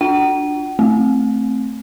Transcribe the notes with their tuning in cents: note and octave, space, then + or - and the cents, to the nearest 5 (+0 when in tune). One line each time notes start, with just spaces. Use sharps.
D4 +0 F4 +0 F#5 +45
A3 +0 C4 +0